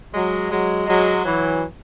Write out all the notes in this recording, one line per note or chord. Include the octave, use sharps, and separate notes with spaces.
F#3 G#3
F#3 G#3
F#3 G#3
E3 F#3